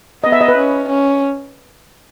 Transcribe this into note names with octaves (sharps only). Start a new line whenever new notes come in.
B3 D#5
E5
D#5
B4
C#4
C#4